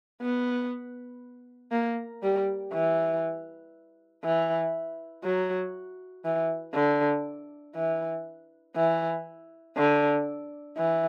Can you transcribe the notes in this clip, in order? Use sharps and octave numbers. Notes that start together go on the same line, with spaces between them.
B3
A#3
G3
E3
E3
F#3
E3
D3
E3
E3
D3
E3